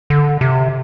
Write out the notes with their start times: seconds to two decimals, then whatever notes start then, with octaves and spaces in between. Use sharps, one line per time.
0.10 D3
0.41 C3